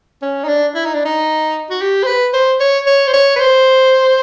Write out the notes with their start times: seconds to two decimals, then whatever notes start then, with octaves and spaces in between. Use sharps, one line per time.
0.22 C#4
0.44 D#4
0.48 D4
0.75 E4
0.85 D#4
0.94 D4
1.05 D#4
1.70 F#4
1.82 G4
2.03 C5
2.07 B4
2.33 C5
2.60 C#5
2.87 C#5
3.08 C5
3.14 C#5
3.36 B4
3.40 C5